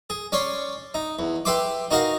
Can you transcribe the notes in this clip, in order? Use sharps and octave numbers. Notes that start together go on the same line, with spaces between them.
G#4
C#4 C#5 D5 C6
D#4
E2
G4 B4 E5 G5 C6 D6
D#4 F#4 A#4 D#5 F5